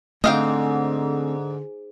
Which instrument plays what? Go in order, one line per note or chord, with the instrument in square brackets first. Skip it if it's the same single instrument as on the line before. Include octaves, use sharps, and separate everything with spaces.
[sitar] G#2 [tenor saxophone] D3 [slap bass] A3 C4 [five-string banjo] D#5 F5 G5